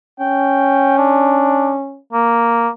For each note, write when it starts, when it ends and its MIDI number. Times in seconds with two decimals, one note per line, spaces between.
0.20 1.99 61
0.20 0.95 79
0.98 1.74 62
2.13 2.69 58